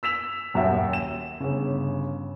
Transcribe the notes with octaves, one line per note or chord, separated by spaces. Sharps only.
E6 B6 E7 F7
D#1 F#2 F#4 E5 G5
E7
G1 C#3